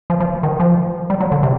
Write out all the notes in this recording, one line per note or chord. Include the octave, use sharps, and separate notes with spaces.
F3
F3
D#3
F3
G3
F#3
D3
C3